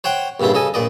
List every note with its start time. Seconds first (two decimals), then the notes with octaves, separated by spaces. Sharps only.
0.04 C5 C#5 F#5 G5
0.40 A#1 G2 C#3 E4 F4
0.54 C#3 A4 D#5 G#5
0.74 A#1 A#2 D5 D#5